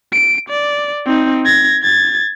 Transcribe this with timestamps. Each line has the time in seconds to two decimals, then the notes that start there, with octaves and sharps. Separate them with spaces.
0.12 D7
0.49 D5
1.06 C4 D#4
1.45 G#6 A#6
1.83 G#6 A6